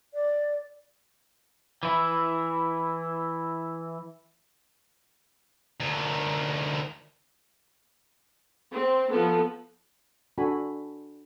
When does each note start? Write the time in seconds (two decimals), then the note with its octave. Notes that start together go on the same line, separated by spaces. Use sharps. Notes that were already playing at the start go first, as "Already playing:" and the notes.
0.14 D5
1.83 E3 E4
5.80 D2 D#3
8.72 C4
9.10 F3 B3 A4
10.38 D4 F#4 A4 G#5 B5